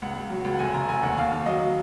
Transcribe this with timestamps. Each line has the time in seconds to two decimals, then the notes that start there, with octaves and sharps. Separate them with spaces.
0.02 C#2 F#5
0.16 C#2
0.30 F#3
0.45 C#2
0.53 F#5
0.59 F1 G#5
0.74 F1 A#5
0.88 F1 G#5
1.03 D#2 F#5
1.18 D#2 F5
1.31 D#2
1.46 F#3 D#5